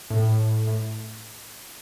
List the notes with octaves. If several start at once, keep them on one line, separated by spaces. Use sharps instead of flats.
A2
A2